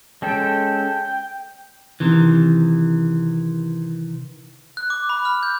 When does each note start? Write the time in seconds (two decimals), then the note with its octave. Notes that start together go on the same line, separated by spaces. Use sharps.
0.22 G#3 C#4 A4 G5
2.00 C3 D#3 E3
4.77 F#6
4.90 D6
5.09 B5
5.25 F6
5.43 G6